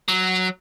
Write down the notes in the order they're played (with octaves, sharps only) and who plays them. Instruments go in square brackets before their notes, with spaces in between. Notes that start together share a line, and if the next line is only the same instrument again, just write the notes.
[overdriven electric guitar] F#3